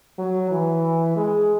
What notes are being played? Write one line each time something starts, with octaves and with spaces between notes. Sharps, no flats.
F#3
E3
G#3